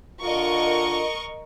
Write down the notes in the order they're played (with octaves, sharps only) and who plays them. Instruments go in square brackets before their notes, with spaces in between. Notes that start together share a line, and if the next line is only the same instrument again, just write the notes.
[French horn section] D3 F4 [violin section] A#4 D#5 C#6